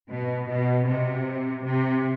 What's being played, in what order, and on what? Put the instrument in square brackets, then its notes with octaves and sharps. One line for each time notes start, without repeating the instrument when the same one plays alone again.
[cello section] B2
B2
C3
C3